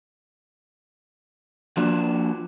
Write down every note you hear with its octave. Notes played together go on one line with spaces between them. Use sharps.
F3 A#3 D4 F#4